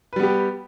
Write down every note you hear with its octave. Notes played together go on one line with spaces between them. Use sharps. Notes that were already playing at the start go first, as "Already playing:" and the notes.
G3 B3 G4 B4